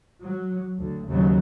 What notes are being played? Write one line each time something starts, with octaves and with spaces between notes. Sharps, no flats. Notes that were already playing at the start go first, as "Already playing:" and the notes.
F#3
D2
D#2 C#3 F#3